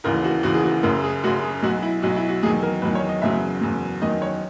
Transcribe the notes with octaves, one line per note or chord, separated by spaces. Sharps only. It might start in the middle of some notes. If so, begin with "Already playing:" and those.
E1 D#2 C#3 E3 A#4
F#4
E1 D#2 C#3 E3 F#4
G#4
F#4
F#1 F#2 C#3 A#4
G#4
F#1 F#2 C#3 F#4
G#4
B1 B2 F#3 F#4
E4
B1 B2 F#3 F#4
E4
F#4
E2 D#3 F#3 G#4
A#4
E2 D#3 F#3 B4
C#5
D#5
F#1 E2 C#3 F#3 E5
F#1 E2 C#3 F#3
F#1 E2 D#3 F#3 D#5
C#5